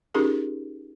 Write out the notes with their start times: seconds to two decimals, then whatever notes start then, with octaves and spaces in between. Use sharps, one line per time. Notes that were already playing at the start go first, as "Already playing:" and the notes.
0.14 C#4 D#4 F4 G4 G#4 A#4